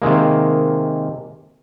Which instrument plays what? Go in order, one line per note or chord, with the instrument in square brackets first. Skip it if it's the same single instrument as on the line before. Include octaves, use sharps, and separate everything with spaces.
[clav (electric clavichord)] C3 D#3 G#3 A#3